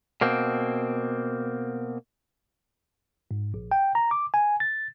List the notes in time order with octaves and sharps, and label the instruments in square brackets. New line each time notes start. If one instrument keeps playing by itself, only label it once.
[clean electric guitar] B2 A#3 C4
[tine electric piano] G#2
A#1
G5
A#5
D6
G#5
A6